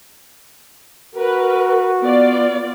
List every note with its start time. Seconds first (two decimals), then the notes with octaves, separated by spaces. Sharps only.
1.16 F#4 A#4 B4
2.02 B3 F4 D5